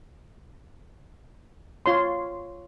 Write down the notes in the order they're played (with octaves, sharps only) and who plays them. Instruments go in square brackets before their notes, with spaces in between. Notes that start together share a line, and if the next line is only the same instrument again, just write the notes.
[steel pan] F4 C#5 C6